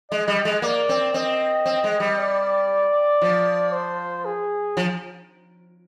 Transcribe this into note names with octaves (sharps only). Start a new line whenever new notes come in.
G#3 D#5
G3
G#3
A#3 D5
C4
C4 D#5
C4
G#3
G3
D5
F3
C5
G#4
F3